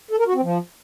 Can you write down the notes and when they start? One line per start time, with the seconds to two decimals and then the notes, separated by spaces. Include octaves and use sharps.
0.11 A4
0.19 A#4
0.27 F#4
0.35 C4
0.43 F3